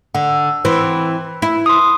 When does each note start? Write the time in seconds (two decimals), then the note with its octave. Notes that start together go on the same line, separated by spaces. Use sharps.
0.15 D3 F#5
0.65 E3 C4 B4
1.42 E4
1.66 C6 D#6